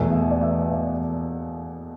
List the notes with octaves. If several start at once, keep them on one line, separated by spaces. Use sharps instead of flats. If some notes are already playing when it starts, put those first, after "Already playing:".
Already playing: E2 B2 A3 E5 G#5
E5
D5
E5
E5
D5 F5